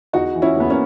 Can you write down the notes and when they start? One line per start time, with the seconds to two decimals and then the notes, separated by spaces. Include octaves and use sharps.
0.13 E2 D#4 F#4
0.35 E3
0.42 C#4 E4
0.56 E2 B3
0.70 A#3 C#4